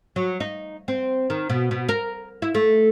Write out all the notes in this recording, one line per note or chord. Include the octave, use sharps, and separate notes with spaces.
F#3
D#4
C4
D#3
B2
B2
A#4
E4
A3